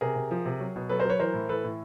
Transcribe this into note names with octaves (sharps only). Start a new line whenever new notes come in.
C3 G#4 A#4
C3
F3
C3
F#3
B2
F#3 A4 B4
A#4 C5
F#3 B4 C#5
E3 A#4 C5
A2
E3 A4 B4
A2